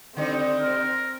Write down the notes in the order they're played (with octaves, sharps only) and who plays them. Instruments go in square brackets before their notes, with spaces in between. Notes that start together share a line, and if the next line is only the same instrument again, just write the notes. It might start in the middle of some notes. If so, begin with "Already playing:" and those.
[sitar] D3 G3 D#4 [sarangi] C4
[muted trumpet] A#4